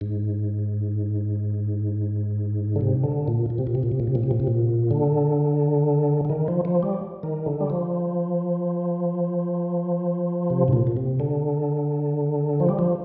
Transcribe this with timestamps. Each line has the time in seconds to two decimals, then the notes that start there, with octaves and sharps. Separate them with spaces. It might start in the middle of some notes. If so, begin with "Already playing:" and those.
0.01 G#2
2.76 D3
2.81 C3
3.04 D3
3.28 A#2
3.50 A#2
3.58 C3
3.67 A#2
3.75 C3
3.83 A#2
3.92 C3
4.00 A#2
4.07 C3
4.15 A#2
4.23 C3
4.31 A#2
4.40 C3
4.47 A#2
4.91 D3
6.25 D3
6.29 D#3
6.48 F3
6.65 F3
6.83 G3
7.23 D#3
7.46 D3
7.61 G3
7.70 F3
10.50 C3
10.68 G#2
10.73 A#2
10.87 A#2
10.97 C3
11.20 D3
12.60 F3
12.69 G3
12.79 F3